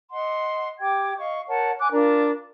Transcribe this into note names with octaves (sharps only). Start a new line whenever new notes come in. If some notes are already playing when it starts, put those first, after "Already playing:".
D#5 F#5 C6
G4 G5 D6 G#6
D#5 F5 C#6
A#4 C#5 F#5 A5
G#5 D6 F#6
D4 F4 A#4